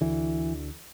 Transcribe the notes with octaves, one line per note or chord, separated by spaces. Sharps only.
D2 D3 E3